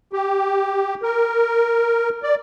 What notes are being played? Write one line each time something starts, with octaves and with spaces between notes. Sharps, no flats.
G4
A#4
D5